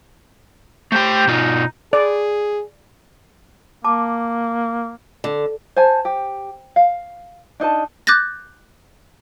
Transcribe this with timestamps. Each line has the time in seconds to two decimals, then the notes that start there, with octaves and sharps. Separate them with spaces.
0.92 A3 G4 C5 G5
1.27 B2 D#4 F4
1.93 G#4 D5
3.84 A#3 A5 D6
5.24 D3
5.76 C5 G#5 A5
6.05 G4
6.76 F5
7.60 D4 D#4 D#5 A5
8.07 D6 F#6 G6 A6 A#6